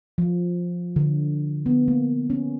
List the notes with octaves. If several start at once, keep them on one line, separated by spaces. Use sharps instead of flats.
F3
D3
B3
A#3
C#4